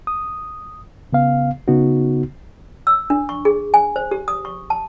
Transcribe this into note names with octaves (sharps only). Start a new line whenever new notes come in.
D#6
C#3 B3 F5
C#3 B3 D#4 F#4
E6
D4
C#6
G#4
G#5
C5
G4
D#6
C#6
A5